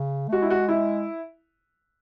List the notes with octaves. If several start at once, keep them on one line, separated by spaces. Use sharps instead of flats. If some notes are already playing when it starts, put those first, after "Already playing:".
Already playing: C#3
A3
G#3 F#4
E4
F#4
E4